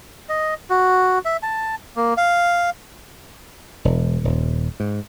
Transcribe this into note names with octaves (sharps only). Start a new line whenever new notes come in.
D#5
F#4
E5
A5
A#3
F5
E1
D#1
G#2